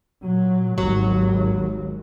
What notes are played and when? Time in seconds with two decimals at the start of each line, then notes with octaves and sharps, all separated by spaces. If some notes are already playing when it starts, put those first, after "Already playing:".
0.24 A#2 F#3
0.78 G#1 D#2 G#2 F#3